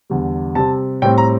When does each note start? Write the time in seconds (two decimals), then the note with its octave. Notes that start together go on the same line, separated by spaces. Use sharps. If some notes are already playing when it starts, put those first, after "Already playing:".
0.10 E2 D3 G3
0.55 C3 G3 C4 A5
1.02 A2 G3 C4 G5
1.18 A#5